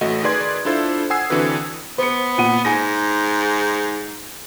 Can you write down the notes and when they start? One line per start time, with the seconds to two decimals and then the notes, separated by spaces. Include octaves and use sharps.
0.01 A1 A3 F#4 D#5
0.23 D#3 G#4 B4 D5 C6 G#6
0.65 D4 E4 F4 A4 C5
1.10 F#5 G#5 D#6 E6 G#6 C7
1.30 D3 E3 C4 F#4 B4
1.98 B3 C5 C#7
2.38 A#2 F#5 D#7
2.65 G#2 G#5 A#6